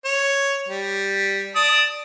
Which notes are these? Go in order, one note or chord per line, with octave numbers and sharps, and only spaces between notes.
C#5
G3
D5 A5 D#6